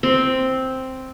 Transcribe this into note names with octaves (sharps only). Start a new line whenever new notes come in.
C4